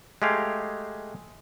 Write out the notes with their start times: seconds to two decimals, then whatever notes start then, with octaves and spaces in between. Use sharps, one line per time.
0.22 G#3 A3 G4 G#4 F5